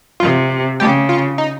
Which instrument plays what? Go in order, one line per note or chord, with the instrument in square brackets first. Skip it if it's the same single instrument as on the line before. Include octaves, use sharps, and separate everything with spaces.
[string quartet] C3 [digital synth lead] F4
[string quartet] C#3 [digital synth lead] G4
[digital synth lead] F4
D#4